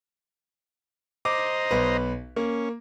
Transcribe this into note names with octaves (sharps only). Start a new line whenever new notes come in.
C5 D#5 A#5 D6
B1 B4
A#3 C#4